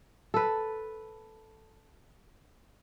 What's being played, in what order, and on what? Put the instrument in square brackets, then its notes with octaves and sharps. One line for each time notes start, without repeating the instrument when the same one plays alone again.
[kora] A4 B4